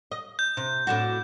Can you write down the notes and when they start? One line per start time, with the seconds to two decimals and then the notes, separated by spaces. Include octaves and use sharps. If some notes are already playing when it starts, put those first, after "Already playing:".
0.11 D#5
0.39 G6
0.57 C3
0.87 A2 D4 F#4